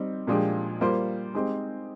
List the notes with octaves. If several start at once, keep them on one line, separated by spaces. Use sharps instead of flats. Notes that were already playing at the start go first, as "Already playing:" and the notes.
Already playing: G3 C4 D#4
A#2 F3 G#3 D4 G4
G3 A#3 F4 C5
G#3 C4 D#4 G4 C5